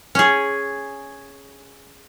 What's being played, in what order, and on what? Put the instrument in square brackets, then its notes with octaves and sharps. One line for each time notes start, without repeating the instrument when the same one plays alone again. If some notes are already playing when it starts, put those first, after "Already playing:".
[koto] C#4 G#4